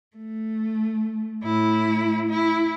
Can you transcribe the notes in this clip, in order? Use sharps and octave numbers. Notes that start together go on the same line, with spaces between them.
A3
A2 E4
E4